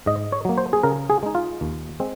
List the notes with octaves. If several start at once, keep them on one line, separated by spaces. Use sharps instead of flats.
G#2 D#5
C#5
F#3 A#3
C5
G#4
C#3 A#4
G#4
G#3 D#4
F4
D#2
G#3 C4